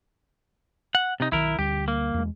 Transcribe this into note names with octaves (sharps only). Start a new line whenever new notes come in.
F#5
C3 D#4
B1 D#3 E4 A#4
D2 D3 G3 G4
A#3
E2 G#3